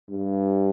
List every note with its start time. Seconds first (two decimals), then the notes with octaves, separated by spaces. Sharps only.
0.10 G2